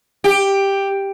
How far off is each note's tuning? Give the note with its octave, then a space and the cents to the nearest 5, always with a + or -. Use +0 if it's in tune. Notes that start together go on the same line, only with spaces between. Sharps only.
G4 +5